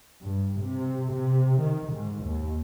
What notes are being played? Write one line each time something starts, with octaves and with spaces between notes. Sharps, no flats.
G2
C3
C3
D#3
G#2
D#2